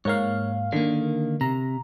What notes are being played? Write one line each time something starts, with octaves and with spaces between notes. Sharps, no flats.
G#2 A#3 C#5 F5
D3 D#3 A#3
C3 A#5